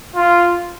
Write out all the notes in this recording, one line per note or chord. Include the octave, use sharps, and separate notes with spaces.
F4